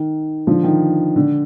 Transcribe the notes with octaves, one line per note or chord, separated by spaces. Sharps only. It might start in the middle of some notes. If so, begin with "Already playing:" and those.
Already playing: D#3
D3 F3
D#3
D3